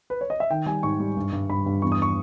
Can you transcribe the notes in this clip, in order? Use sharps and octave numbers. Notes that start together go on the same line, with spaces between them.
B4
C#5
D#5
E5
D#3 G5
G3 G#5
G#2 C#6
G3
G2
G2
G2 B5
G2
E2 C#6
D#6
C#6